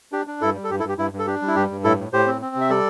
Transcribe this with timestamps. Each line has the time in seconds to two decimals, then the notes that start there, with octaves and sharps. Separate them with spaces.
0.12 D4 G4
0.27 D4
0.41 G2 E4 A4
0.55 G3
0.64 A4
0.70 G2 G4
0.79 E4 A4
0.84 G2 G4
0.98 G2 E4
1.13 G2
1.19 A4
1.27 D4 G4
1.42 G3
1.47 E4
1.56 G2 G4
1.70 G2
1.84 A2 E4 A4
1.98 A2
2.12 A2 G4 C5
2.27 C4
2.41 C4
2.55 C3
2.61 E5
2.70 G3 A4 D5